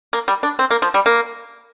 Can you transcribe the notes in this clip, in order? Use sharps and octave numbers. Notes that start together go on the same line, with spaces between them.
A#3
G3
D4
C4
A#3
F3
G3
A#3